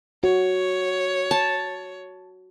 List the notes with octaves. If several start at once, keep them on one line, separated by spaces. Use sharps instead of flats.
F#4 C#5
A5